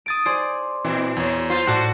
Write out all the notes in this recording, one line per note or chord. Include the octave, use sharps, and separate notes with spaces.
D#6 A6 D7
G#4 C5 D5
A#2 E3 C4
E2 C#5
F4 C5
A2 F#4 D5 A5 F#6